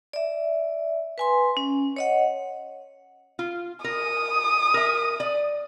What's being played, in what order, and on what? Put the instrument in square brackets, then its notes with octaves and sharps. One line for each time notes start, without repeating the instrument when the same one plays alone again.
[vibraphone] D5 E5
B4 G#5 C6
C#4
C#5 D#5 F#5
[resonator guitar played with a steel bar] F4
[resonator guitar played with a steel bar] A#4 [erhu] D#6
[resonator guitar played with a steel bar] A#4 E5
D5